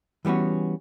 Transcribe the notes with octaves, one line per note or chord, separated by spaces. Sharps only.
E3 G3 B3 C#4 F#4